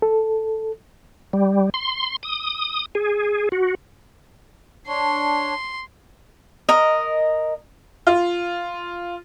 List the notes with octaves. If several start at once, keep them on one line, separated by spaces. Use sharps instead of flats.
A4
G3
C6
D#6
G#4
F#4
D4 C#5 C6
A#4 D#5
F4